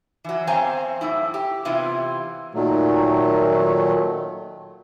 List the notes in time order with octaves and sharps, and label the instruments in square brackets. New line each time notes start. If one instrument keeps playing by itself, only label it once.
[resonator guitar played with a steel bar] E3 F#3
E2 C4 C5 F5 G#5 A#5
F#2 A2 E4
G4
C3 E3 B3 E4 F4
[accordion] A#2 D#3 F#3 A3